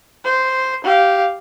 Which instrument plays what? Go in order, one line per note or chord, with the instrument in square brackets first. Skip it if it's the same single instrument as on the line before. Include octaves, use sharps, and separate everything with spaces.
[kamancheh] C5
G4 F5